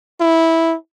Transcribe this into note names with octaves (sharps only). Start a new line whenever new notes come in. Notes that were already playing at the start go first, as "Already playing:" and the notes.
E4